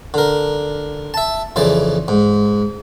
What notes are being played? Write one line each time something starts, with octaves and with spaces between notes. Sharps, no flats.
D3 A#4
E5 A5
F2 C#3 E3 D5
G#2